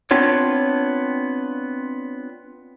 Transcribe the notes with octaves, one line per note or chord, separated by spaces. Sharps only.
B3 C4 D4 F4 C#5